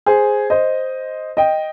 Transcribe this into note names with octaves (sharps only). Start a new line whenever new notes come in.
G#4 C5
C5 D#5
D#5 G5